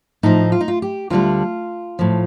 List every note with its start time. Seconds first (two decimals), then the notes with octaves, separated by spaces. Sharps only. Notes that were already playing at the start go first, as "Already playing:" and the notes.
0.23 A2 F3 D#4
0.52 F4
0.61 D#4
0.68 F4
0.82 G4
1.10 D2 D3 G3 F4
1.99 A2 F3